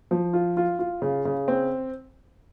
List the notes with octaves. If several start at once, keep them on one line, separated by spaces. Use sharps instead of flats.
F3
F4
F4
F4
C#3
C#3
C4